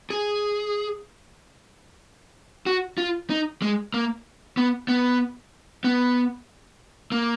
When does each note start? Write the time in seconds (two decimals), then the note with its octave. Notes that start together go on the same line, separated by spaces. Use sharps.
0.10 G#4
2.66 F#4
2.98 F4
3.30 D#4
3.62 G#3
3.94 A#3
4.57 B3
4.88 B3
5.84 B3
7.12 A#3